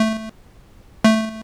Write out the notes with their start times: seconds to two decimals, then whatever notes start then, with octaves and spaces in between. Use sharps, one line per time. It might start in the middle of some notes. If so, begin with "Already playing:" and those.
Already playing: A3
1.04 A3